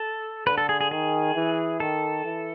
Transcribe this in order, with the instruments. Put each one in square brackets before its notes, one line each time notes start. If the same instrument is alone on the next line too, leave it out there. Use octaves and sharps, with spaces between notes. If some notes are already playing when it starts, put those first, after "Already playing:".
Already playing: [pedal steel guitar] A4
[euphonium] D3 [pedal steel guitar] B4
[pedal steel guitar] A4
G#4
G#4
[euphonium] D#3 [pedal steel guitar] G#4
[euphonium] E3
[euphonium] D#3 [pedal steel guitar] A4
[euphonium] E3